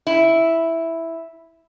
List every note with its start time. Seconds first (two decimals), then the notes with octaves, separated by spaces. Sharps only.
0.07 E4